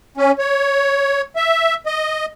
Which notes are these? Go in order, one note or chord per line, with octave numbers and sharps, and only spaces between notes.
C#4
C#5
E5
D#5